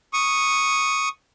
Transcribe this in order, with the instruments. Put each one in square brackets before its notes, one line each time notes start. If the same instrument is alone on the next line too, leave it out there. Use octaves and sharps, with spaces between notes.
[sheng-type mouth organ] C#6 D#6